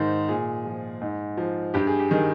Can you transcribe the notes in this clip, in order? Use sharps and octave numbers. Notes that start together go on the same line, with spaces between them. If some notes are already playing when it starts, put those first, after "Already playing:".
Already playing: G#2 D#3 C5
A#2 G#4
F3
G#2
F3
G2 G4
G#4
G4
D#3 G#4